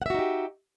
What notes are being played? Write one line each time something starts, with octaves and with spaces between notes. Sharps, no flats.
D#4 F#4 G4 E5 F#5